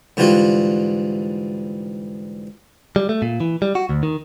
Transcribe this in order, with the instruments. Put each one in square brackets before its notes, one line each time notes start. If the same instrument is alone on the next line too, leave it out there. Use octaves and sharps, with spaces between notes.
[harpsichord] G#2 D3 E3 G3 F4 F#4
[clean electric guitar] G3
A3
A#2
E3
G3
F#4
D2
D#3